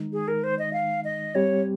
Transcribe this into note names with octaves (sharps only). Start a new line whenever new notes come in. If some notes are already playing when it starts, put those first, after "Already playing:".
Already playing: D#3 G#3 D#4
G#4
A#4
C5
D#5
F5
D#5
G3 C4 G4 C#5